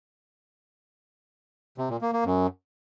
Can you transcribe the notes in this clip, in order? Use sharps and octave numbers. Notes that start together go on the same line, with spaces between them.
C3
A#2
A#3
A#3
F#2